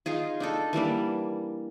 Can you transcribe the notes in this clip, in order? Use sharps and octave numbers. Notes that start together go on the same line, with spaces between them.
D#4 F4 G#4
D4 D#4 A4
E3 G3 A#3 D4